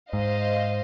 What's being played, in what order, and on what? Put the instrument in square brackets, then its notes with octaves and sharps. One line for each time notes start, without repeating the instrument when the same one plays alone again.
[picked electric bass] G#2 [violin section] C5 D#5 F5